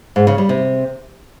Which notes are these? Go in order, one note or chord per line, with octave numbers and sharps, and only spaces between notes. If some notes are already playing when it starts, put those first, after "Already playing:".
G#2
C#3
G3
C3